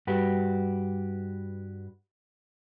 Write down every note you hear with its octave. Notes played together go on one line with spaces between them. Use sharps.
G2 F#4 G4 B4